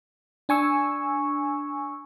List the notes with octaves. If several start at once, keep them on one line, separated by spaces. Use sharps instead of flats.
D4 G#5 C#6 E6